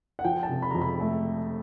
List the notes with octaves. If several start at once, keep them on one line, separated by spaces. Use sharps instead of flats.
F#5
F3 G5
A5
C3
B5
F2 A#5
B5
A3